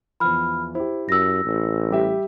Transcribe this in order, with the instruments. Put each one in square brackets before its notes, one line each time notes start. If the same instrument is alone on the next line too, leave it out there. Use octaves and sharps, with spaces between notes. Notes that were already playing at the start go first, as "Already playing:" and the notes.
[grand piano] E2 F3 [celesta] B5 F6
[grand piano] E4 G4 [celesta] C5
[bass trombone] F#2 [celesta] E6 A#6
[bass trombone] A1
[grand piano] G3 G4 E5